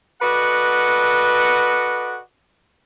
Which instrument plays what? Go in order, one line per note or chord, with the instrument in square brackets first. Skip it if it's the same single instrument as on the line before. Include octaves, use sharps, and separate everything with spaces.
[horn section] F#4 A4 B4 D5 D#5 F#5